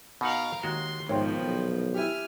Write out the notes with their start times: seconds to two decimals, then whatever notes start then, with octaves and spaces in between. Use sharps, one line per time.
0.21 B2 D#4 A#4 F5 F#5
0.63 D#2 G#3 F#4 C6
1.09 A#1 G#2 B2 D#3 F3 C#5 G5 C6
1.43 B1
1.94 E4 G4 G#5 F6